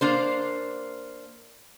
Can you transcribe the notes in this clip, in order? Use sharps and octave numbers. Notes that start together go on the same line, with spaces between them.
A#3 D4 C5